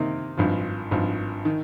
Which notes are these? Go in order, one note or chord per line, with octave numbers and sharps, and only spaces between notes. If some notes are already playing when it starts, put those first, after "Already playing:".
Already playing: C3 D#3 A#3 D#4
G#1 G2 F3
G#1 G2 F3
D#3